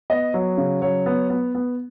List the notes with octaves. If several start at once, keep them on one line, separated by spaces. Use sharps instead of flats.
B3 D#5
F#3
C#3
F#3 C#5
B3
B3
B3